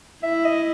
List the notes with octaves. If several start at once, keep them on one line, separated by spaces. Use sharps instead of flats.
E4 E5
D#5